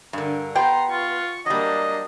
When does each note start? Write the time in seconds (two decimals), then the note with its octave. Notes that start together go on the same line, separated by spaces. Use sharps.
0.13 G2 D3 A#4
0.55 B3 G4 G5 A#5 C6
0.90 F4 C#6
1.46 F#3 G3 A#3 D4 D#5